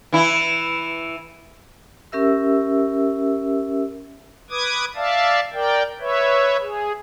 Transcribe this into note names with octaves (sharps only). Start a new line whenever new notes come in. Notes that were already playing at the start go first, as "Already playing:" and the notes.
E3 E4
C#4 G4 A#4 E5 E6
B4 D6 D#6 G#6
D5 E5 F5 A5
A#4 D5 G5
B4 C#5 E5
G#4